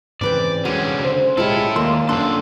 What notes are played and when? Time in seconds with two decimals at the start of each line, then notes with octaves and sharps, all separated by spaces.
0.21 G#2 C#3 E3 C4 B4 D5 G5
0.65 E2 D3 G#3 C#4 F#4 G#5 C6
1.05 C#3 C5
1.37 B1 G#3 E4 F4 G4 A4 C#5
1.76 D#2 A#3 D5 C6
2.09 F#2 D3 D4 A4 A5 C6